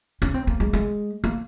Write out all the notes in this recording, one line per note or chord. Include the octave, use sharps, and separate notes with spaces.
C#4
C4
A#3
G#3
G#3
A#3